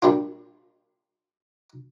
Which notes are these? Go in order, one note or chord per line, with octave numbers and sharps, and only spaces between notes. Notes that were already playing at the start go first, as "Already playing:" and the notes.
A#2 G3 D4 F4